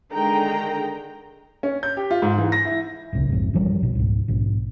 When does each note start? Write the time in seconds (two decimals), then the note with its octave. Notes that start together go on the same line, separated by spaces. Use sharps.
0.14 D3 D#3 G#3 G#4 G5 A#5
1.63 C#4
1.83 G6
1.97 G4
2.11 F4
2.22 G#2
2.38 E3
2.52 A#6
2.65 E4
3.13 D1 G1 C2 C#3
3.30 A#1 F2 G#2
3.54 F#2 E3 F3 G3
3.81 A#1 B2
3.95 C#2 G#2
4.28 A#1 G#2 B2